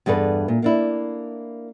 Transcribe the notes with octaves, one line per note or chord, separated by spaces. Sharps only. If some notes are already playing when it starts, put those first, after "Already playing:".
E2 G2 G#4 A4 B4
A#2
A#3 D4 E4